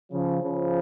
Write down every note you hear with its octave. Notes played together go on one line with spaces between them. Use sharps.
C#3 F3
C#3 F3